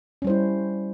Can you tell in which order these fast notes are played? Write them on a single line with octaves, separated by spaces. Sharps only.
C#4 G3 C5 E4